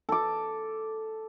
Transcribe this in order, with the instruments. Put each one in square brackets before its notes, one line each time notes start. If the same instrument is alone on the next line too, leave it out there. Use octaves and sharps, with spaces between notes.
[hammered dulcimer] A4 D6